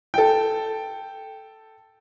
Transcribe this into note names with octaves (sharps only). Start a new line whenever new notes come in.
A4 G5